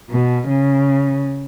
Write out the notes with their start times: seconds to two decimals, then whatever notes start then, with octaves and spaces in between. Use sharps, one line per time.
0.10 B2
0.49 C#3